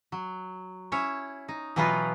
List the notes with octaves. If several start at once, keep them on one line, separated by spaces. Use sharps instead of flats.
F#3
C#4 E4 C#5 E5
D#4
B2 E3 F#3 B3 F4 B4